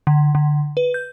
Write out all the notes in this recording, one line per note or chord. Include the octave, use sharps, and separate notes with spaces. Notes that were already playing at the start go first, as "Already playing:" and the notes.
D3
D3
B4
G6